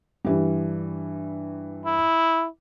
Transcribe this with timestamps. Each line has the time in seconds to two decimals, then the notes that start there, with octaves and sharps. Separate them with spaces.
0.25 G2 E3 G3
1.85 E4